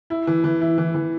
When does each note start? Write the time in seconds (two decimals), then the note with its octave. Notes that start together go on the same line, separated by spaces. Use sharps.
0.10 E4
0.27 E3
0.44 E3
0.61 E4
0.78 E3
0.95 E3